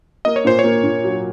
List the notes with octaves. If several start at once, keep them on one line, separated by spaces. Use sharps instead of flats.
A#3 D#5
C#5
A#2 C5
C#5
A#3
A#2
F#3